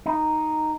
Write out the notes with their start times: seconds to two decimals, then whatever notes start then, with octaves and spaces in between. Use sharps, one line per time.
0.06 D#4